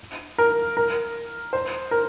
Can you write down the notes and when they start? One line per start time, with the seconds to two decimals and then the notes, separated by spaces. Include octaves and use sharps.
0.38 A#4
0.77 A#4
1.53 C5
1.91 A#4